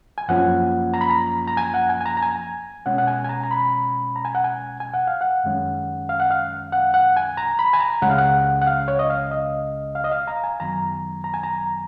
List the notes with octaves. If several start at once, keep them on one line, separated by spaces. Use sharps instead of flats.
G#5
F#2 F3 A#3 C#4 F#5
A#5
B5
A#5
A#5
G#5
F#5
G#5
G#5
A#5
A#5
G#5
B2 G#3 C#4 F#5
F#5
G#5
G#5
A#5
A#5
B5
A#5
G#5
F#5
G#5
G#5
F#5
F5
F#5
F#2 D#3 G#3 C#4
F5
F#5
F5
F#5
F#5
G#5
A#5
B5
G#5
A#5
C#2 C#3 G#3 C#4 F#5
F5
F#5
F#5
F5
C#5
D#5
F5
D#5
F5
D#5
F5
A#5
G#5
F#2 D#3 F#3 B3 A#5
A#5
G#5
A#5